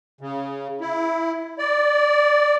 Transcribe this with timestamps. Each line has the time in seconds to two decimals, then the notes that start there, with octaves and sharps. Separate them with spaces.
0.21 C#3
0.81 E4
1.59 D5